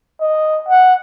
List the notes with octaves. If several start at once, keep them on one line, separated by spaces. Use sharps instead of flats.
D#5
F#5